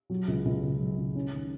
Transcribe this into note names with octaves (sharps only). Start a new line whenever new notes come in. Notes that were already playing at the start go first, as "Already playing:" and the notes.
F#3
C#2
C#2
C#3
F#3
C#2
C#4
D#3